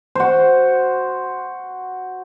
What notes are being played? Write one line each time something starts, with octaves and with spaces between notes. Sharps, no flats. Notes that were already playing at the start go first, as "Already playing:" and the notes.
F#4 C5